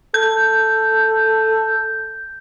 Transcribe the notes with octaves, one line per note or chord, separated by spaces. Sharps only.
A4 G6